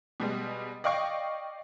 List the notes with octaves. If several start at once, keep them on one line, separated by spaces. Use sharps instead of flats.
B2 G3 G#3
D5 D#5 F5 G5 C#6